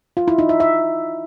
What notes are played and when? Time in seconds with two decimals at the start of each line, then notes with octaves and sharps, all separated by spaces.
0.17 F4
0.28 E4
0.38 D#4
0.49 E5
0.60 E5